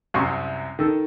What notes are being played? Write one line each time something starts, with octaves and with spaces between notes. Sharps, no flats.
C2 F#2 C3 C6 C#6
D#3 A4